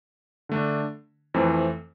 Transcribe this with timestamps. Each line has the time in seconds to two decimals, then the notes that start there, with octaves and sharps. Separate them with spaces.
0.49 D3 A3 D4
1.34 F2 E3 A3 C4